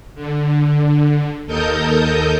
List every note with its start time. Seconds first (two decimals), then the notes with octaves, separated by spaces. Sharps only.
0.15 D3
1.46 D#2 A4 A#4 D#5 D#6 G6